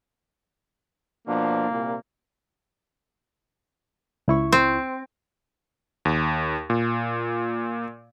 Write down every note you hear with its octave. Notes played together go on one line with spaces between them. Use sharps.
B2 F3 A#3 D4
C2 A#2
C#2 E4 C#6
C4
D#2
A#2